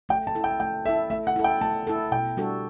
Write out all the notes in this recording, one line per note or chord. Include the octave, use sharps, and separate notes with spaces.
A3 G5
A5
E4 A4
G5
A3 G5
E4 A4 E5
A3 E5
F#5
E4 A4
G5
A3 A5
E4 A4
B2 G5
G3 D4 F#4 A4